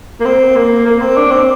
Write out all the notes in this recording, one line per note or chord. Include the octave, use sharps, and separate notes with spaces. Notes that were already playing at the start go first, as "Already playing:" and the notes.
A#3
C4
A#3
A#3
C4
D4
C4